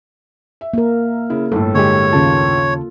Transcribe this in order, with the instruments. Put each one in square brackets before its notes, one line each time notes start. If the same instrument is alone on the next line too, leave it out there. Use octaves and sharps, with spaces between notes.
[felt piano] E5
[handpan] A#3 A#4
[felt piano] C#3 E4
[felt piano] G1 A2 [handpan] A4
[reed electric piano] D3 G#3 G4 [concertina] C#5
[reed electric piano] D#2 C#3 A5 [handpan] F4